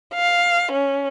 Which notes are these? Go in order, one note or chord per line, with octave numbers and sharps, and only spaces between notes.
F5
C#4